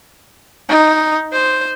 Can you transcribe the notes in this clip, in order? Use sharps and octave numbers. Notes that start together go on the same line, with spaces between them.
D#4
C5